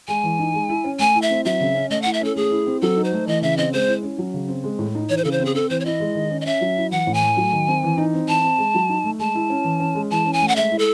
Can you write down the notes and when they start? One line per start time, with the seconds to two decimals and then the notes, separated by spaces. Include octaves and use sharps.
0.08 G#3 G#5
0.24 E3
0.39 D#4
0.54 G#3
0.69 E4
0.84 C#4
0.99 A3 G#5
1.15 E4
1.22 E5
1.30 C4
1.45 F#3 E5
1.60 C#3
1.75 C#4
1.90 A3 D#5
2.02 E4 F#5
2.13 E5
2.21 C#4 A4
2.36 A3 G#4
2.51 E4
2.67 C4
2.82 F#3 A4
2.97 D#4
3.04 C5
3.12 A3
3.27 E3 D#5
3.42 C#3 E5
3.58 C4 D#5
3.73 G#3 C5
3.88 E4
4.03 C#4
4.18 F#3
4.34 C#3
4.48 C4
4.64 G#3
4.79 A2
4.95 D#4
5.09 E3 C#5
5.17 C5
5.24 C#3 A4
5.31 C5
5.39 C4
5.45 G#4
5.54 C4 A4
5.70 E3 C5
5.80 C#5
5.85 E4 D#5
6.00 G#3
6.15 D#3
6.31 C#4
6.41 D#5
6.46 C#4 E5
6.61 F#3
6.77 E4
6.91 E3 F#5
7.07 A2
7.14 G#5
7.23 A3
7.37 F#3
7.52 D#3
7.68 C4
7.83 E3
7.98 D#4
8.14 C4
8.28 E3 A5
8.44 C4
8.58 G#3
8.74 F#3
8.89 D#4
9.04 A3
9.19 G#3 A5
9.35 E4
9.50 C#4
9.65 E3
9.80 C#4
9.95 G#3
10.10 E3 A5
10.26 C#4
10.33 G#5
10.41 A3
10.48 F#5
10.56 G#3 E5
10.71 E4
10.79 A4